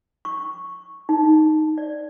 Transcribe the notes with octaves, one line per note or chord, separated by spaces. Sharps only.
C#6
D#4
D5